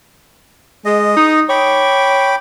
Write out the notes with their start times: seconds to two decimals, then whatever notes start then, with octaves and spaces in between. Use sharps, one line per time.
0.85 G#3 D#5
1.17 D#4
1.49 C#5 G5 B5 D6